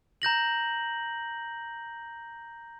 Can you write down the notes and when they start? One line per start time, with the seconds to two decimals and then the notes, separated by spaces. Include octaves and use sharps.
0.22 A#5 G6 A#6 F#7